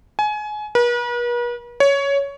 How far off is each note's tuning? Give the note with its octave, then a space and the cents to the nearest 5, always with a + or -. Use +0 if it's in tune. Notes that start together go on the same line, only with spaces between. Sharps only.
G#5 +25
B4 -45
C#5 +15